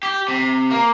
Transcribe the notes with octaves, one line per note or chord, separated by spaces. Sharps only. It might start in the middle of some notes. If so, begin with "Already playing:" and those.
G4
C3
A#3